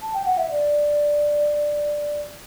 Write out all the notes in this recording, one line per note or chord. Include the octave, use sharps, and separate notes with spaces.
A5
G5
F#5
E5
D5